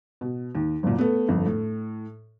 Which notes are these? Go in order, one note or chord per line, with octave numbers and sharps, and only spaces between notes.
B2
D#2
F#1 A#2
A3 B3
G1 F2
A2